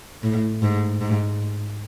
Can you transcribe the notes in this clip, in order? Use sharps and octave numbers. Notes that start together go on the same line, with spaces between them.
A2
G#2
G#2